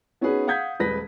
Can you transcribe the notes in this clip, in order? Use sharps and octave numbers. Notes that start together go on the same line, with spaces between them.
B3 C#4 D#4 F#4 G#4 B4
F5 F#5 D#6 G6 G#6 B6
D#1 G#3 B4 A#6 B6